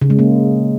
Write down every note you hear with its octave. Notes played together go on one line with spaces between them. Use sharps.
C#3
G#3
A#3